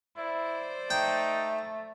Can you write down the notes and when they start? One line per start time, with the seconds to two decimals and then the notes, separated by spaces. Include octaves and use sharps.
0.16 E4 C5 D5
0.90 A3 D#4 G5